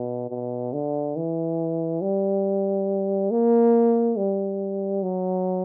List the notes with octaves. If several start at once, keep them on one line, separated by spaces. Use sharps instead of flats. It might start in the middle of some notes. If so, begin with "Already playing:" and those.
Already playing: B2
B2
D3
E3
G3
A#3
G3
F#3